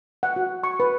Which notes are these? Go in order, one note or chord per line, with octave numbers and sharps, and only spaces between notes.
F#5
F#4
C#6
B4